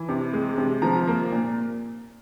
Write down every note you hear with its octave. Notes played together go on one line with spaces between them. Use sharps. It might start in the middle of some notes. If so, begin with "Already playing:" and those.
Already playing: E3
C3
G#3
C3
F3 A#5
A#3
A#2